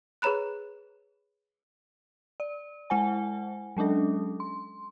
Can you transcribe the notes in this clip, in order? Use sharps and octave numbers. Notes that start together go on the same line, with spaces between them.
G#4 B4 C#5 A#5 B5 F#6
D5
G#3 E4 C5 F#5 G#5
F#3 G#3 C#4 D4 A4
C6